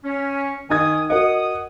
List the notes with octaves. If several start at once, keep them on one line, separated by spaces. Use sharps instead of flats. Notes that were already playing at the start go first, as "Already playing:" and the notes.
C#4
D#3 D#4 G#5 D#6 G#6
F#4 A#4 D#5 F#5 D#6